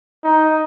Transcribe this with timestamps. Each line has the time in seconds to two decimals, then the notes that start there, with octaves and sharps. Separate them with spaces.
0.24 D#4